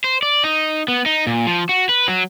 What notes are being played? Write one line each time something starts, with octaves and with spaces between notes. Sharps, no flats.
C5
D5
D#4
B3
D#4
A#2
F3
F#4
B4
F#3